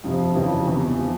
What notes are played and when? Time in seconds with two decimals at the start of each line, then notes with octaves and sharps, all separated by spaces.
0.04 F2 C3 F3
0.35 F2 C#3 E3
0.67 E2 C3 E3
0.99 F3